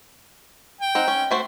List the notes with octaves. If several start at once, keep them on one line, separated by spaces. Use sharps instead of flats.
G5
C4 D#4 F#5
C#4
A3 F#4 C5